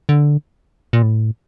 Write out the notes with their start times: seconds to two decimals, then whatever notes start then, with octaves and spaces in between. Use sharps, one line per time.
0.09 D3
0.93 A#2
1.03 A2